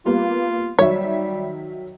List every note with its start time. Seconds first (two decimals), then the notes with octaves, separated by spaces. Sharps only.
0.06 G3 A#3 B3 F4
0.79 D#3 F#3 G3 C#5 E5